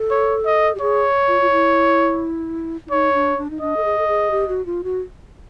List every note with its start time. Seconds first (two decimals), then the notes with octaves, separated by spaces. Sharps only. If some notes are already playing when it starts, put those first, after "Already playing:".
Already playing: A4
0.11 C#5
0.46 D#5
0.75 G4
0.81 G#4 C#5
1.28 F4
1.41 F4
1.51 E4
2.86 E4
2.91 D#4 C#5
3.14 D4
3.38 D4
3.50 D#4
3.61 D4 D#5
3.77 A4
3.85 G#4
3.98 A4
4.08 G#4
4.31 G4
4.48 F#4
4.66 F4
4.84 F#4